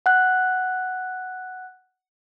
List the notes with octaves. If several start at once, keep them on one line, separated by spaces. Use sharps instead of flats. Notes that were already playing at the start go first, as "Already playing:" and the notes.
F#5 F#6